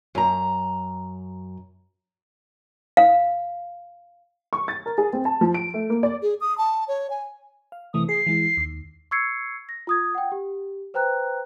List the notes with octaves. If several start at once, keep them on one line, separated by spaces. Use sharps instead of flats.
F#2 A#5
F5
C#6
A6
A#4
G#4
C4
A5
F3
D7
A3
A#3
D5
G#4
D#6
A5
C#5
G#5
F5
C3 E3 A3 D#6
G#4 C7
E3 G#3 E4
D#2
C#6 E6 G#6 C7 C#7
A#6
F4 D#6 G#6
F#5 G5
G4
B4 C5 G5 A#5 F#6